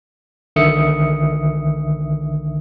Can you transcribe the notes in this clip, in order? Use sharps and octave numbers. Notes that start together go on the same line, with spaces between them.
B1 D3 D#3 E5 D#6 C#7